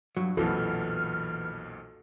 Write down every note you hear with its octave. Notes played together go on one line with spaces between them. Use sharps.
G2 F#3
B1 F2 A#2 E3 F#4 A4 F6